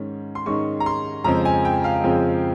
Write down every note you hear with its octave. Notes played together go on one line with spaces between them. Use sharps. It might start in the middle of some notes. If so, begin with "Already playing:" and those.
Already playing: G#2 D#3 G#3 C#4
C6
G#2 D#3 G#3 C#4 C#6
A#5
C6
F2 C#3 F3 G#3 C4 A#5
G#5
G5
F5
F2 C#3 F3 G#3 C4